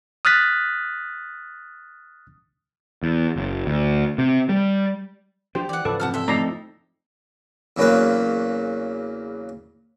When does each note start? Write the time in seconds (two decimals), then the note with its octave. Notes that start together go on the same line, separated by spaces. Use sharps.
0.25 D#6 F6 F#6 A6 B6
3.03 E2
3.36 F#1
3.67 D2
4.18 C3
4.49 G3
5.55 F3 D4 G4 C5
5.69 E3 D5 F#5
5.85 G#2 C#3 E3 F3 A4 B4
6.00 F2 C3 F#5 A5 F6
6.14 C4 A4 E5
6.28 F2 A3 D#4 D5 A#5 C7
7.77 E2 C#3 F#3 A#3 B4